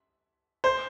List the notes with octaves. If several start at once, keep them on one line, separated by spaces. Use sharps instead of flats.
C5